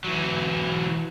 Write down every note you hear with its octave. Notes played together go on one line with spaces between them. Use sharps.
E3 F#3